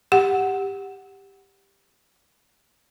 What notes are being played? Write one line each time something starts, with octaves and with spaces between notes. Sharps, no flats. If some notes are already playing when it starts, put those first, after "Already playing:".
G4 F#5